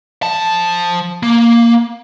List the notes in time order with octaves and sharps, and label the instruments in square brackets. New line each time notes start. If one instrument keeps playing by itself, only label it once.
[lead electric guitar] F3 A5
A#3